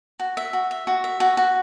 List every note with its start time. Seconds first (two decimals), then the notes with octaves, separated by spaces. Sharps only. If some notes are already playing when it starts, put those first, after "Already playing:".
0.20 F#4
0.37 E5
0.53 F#4
0.71 E5
0.87 F#4
1.04 E5
1.20 F#4
1.37 F#4